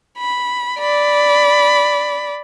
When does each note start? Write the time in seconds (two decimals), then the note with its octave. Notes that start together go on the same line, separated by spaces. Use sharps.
0.18 B5
0.80 D5 B5